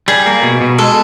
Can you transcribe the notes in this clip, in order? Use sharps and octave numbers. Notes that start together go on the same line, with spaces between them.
G3 G#4
A#3
B2
B2
G#3 A4